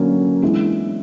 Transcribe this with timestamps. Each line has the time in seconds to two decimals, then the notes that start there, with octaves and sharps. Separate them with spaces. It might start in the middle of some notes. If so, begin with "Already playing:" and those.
Already playing: D3 F#3 A#3 C#4
0.42 E3 G#3 B3 D4